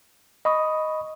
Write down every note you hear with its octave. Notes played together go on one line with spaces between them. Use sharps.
D#5 B5 C#6 D#6